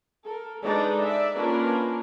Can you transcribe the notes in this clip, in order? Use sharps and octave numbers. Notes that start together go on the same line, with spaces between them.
A4 A#4
G#3 D4 D#4 A4 B4 D5
D5 E5
A#3 C#4 D4 F4 A#4 B4